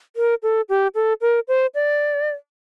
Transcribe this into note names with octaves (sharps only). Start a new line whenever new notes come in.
A#4
A4
G4
A4
A#4
C5
D5